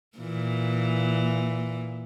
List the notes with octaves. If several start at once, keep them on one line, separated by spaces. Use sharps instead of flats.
A#2 E3